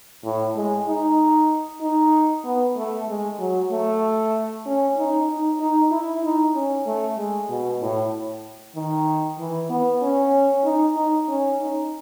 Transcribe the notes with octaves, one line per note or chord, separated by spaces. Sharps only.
A2
G#3
D#4
D#4
B3
A3
G#3
F#3
A3
C#4
D#4
D#4
D#4
E4
D#4
C#4
A3
G#3
B2
A2
D#3
E3
B3
C#4
D#4
D#4
C#4
D#4